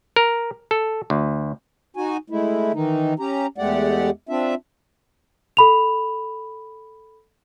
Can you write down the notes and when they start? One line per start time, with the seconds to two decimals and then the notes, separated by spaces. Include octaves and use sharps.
0.16 A#4
0.71 A4
1.10 D2
1.96 D#4 F#4 G#5
2.30 G#3 A3 E4
2.74 D#3 E3 D#4
3.19 C#4 G4 A#5
3.58 E2 G#3 A3 G4 D5 F#5
4.29 C4 D4 F4 E5
5.57 A4 B5 F7